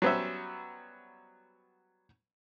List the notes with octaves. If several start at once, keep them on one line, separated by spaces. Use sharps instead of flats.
F#3 G3 B3 C#4 C5 E5